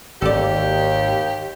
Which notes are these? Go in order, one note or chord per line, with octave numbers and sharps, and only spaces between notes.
G#1 D#2 G4 A4 D5